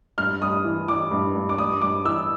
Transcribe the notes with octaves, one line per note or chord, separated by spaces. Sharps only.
G2 F6
G2 D#6
E3
E3 D6
G2
G2
D6
G2 D#6
G2 D6
E3 E6